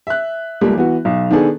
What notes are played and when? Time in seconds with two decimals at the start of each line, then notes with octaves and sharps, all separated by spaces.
0.07 E5 F#6
0.61 C#2 G3 A3 A#3
0.75 E3 B3 F#4
1.05 B1
1.31 D#3 B3 D4 G#4 A4